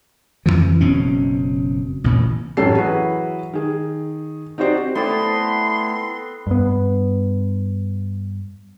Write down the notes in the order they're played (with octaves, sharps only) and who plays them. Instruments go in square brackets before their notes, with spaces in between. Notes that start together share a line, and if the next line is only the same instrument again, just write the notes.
[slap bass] F2 C#3 E3 F3
F#1 B2 C4 C#4
A1 A#2
[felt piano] A1 F#2 C#4 A4 C7
E3 F#3 F#4 G#4 B4
D#3 G#4
C4 D#4 F#4 G4 C5 D5
[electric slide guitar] A3 E4 D5 [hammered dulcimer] B3 C4 [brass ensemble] A4 [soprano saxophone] C6
[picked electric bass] G2 B3